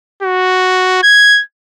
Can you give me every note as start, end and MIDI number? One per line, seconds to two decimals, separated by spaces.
0.23 1.02 66
1.03 1.41 92